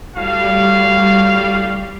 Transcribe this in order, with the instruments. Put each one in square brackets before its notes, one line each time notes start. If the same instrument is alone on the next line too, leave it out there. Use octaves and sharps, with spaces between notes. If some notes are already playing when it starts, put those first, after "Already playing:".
[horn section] A2 F#4 F5 [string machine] G3